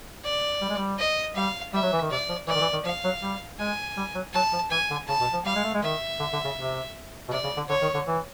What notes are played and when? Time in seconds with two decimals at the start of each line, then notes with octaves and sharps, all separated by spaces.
0.24 D5
0.61 G3
0.69 G#3
0.77 G3
0.99 D#5
1.36 G3 F5
1.74 G3 E5
1.83 F#3
1.92 E3
2.02 D#3
2.11 C3 D5
2.29 F3
2.47 E3 D5
2.55 D#3
2.60 E3
2.73 D#3
2.85 F3 F5
3.04 F#3
3.22 G3
3.59 G#3 G#5
3.97 G3
4.15 F#3
4.34 F#3 A5
4.53 F3
4.71 E3 G#5
4.90 D3
5.08 C#3 A5
5.21 B2
5.33 F3
5.45 G3 F5
5.55 G#3
5.64 A3
5.74 G#3
5.83 D#3 E5
6.20 D3
6.33 D3
6.44 C#3
6.58 C3
7.28 B2
7.32 C3 D5
7.44 C#3
7.57 D3
7.69 D3 C#5
7.82 D#3
7.94 D3
8.07 E3